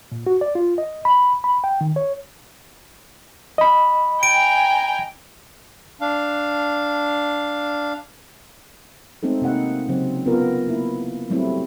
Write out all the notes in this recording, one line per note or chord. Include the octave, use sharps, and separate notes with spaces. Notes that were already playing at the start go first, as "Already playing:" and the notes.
A#2
F#4
D5
F4
D#5
B5
B5
G5
D#3
C#5
D#5 B5
G5 G#5 A#5 D7
D4 F5
G#3 A3 C4 D#4 A4
C3 A#3 D#4 F#5
C#3 F#3 C4
B3 F4 A#4
A#3 E4
F#3 G3 A3 C4 E4